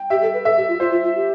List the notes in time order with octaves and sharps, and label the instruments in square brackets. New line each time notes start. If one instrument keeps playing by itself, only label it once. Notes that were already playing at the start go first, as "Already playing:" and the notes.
Already playing: [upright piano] G5
[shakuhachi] G4 [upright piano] E5
[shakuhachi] A4
B4
[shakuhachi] A4 [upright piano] E5
[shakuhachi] G4
F4
[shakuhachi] F4 [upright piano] C5
[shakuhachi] F4
F4
G4